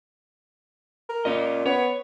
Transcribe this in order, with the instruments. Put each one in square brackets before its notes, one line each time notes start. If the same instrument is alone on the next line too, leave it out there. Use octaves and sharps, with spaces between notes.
[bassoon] A#4
[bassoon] A#2 [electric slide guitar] C#4 D#5
[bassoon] B3 [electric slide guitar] C#5